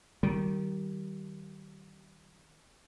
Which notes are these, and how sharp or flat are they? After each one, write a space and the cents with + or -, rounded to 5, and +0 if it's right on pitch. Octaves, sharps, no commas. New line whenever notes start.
D#3 +0 G3 -30